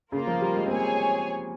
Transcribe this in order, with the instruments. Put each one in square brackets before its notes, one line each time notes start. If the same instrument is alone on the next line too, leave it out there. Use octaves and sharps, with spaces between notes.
[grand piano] C#3 [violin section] A#3 F4 A#4
[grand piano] F3
G3
G#3
C4
[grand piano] A#3 [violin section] G#4 C#5 G#5